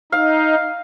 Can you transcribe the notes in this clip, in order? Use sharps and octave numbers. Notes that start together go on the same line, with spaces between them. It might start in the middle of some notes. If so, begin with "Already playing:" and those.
D#4 F5